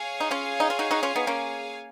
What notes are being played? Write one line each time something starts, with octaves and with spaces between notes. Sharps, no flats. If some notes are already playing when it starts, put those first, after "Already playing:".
Already playing: G#4 C#5 F5 G#5
D#4
C#4 F4
D#4
F4
D#4 F#4
D#4 F#4
C#4 F4
B3 D#4
A#3 C#4